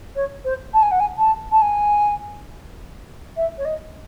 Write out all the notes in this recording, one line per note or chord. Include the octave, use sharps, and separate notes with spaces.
C#5
C5
A5
G#5
F#5
G#5
A5
A5
G#5
E5
C#5
D#5